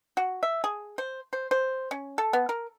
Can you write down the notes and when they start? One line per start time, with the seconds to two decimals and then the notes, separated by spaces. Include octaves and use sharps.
0.17 F#4
0.43 E5
0.64 G#4
0.98 C5
1.33 C5
1.51 C5
1.91 C#4
2.18 A4
2.33 B3
2.49 A#4